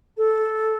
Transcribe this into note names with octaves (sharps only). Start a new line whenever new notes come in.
A4